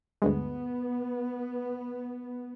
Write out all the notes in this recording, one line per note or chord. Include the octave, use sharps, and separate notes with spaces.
D2 G2 G#3 B3